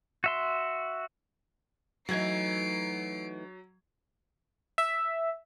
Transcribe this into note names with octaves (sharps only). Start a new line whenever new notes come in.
F#4 E5 C6
E3 F#3 A3 D#4 G#6 C7 D7
E5